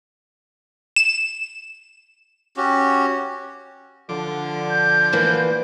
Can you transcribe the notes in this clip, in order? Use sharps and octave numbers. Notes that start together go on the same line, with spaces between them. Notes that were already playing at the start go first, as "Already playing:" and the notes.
E7
C#4 F#4 G4
D3 F3 D6
G6
E3 A#3